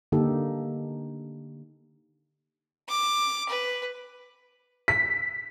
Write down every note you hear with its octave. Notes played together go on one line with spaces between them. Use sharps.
D3 A#3 D#4 G4 A4
D6
B4
B6